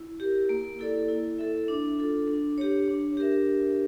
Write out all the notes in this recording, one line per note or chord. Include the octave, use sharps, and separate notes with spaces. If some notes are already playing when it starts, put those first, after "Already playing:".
Already playing: E4
G4 A#4
A#3
E4 A4 D5
E4
A4 E5
D4
F4 A4
D4
G4 C#5
D4
G4 A#4 E5